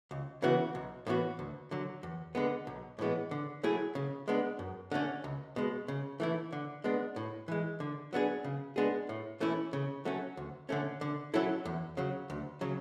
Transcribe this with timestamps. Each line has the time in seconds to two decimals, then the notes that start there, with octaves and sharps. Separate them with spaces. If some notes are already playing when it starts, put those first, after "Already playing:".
0.11 C#2
0.42 C#3 E3 B3 F#4
0.75 B1
1.07 A2 E3 B3 F#4
1.39 D2
1.71 D3 F#3
2.03 E2
2.35 D3 G#3 B3
2.67 B1
2.99 A2 E3 G#3 B3
3.31 D3
3.63 F#3 A3 E4 G#4
3.95 C#3
4.28 G#3 B3 D4
4.59 F#2
4.92 D3 A3 C#4
5.24 C#2
5.56 B2 G#3
5.88 C#3
6.20 E3 A3 E4
6.52 D3
6.84 G#3 B3 D4
7.16 A2
7.48 E3 G#3
7.80 D3
8.13 F#3 B3 D4 G#4
8.44 C#3
8.76 G#3 B3 D4 G#4
9.09 A2
9.40 E3 A3 C#4 E4
9.73 C#3
10.05 F#3 A3 C#4
10.37 D2
10.69 D3 A3 C#4
11.01 D3
11.34 F#3 C#4 E4 A4
11.65 E2
11.97 C#3 F#3
12.30 D2
12.61 C#3 F#3 C#4